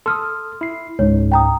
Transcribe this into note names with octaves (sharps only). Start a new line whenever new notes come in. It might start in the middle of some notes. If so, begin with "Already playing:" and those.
A4 C6 D#6 F6
E4 C7
C#2 G#2 C#5
G5 A#5 D#6